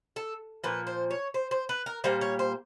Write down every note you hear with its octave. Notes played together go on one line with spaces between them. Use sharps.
A4
A#2 F3 A#3 B4
C5
C#5
C5
C5
B4
A#4
A#2 G3 A#3 C5
C#5
C5